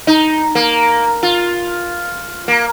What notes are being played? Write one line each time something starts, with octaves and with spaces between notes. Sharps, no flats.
D#4
A#3
F4
A#3